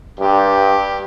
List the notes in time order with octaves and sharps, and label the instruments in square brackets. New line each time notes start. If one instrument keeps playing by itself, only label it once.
[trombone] G2 [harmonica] G4